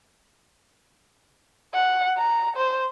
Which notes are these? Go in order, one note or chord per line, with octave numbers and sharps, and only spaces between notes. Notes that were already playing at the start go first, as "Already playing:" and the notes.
F#5
A#5
C5